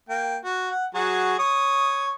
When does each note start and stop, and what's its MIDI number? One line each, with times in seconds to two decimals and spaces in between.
0.09 0.37 58
0.09 0.37 79
0.44 0.70 66
0.70 0.86 78
0.95 1.35 54
0.95 1.35 66
0.95 1.35 68
1.39 2.14 73
1.39 2.14 87